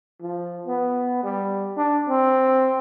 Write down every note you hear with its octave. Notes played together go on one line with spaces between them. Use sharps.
F3
B3
G3
D4
C4